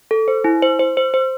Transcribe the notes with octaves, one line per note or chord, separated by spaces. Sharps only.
A4
C5
E4
C5
C5
C5
C5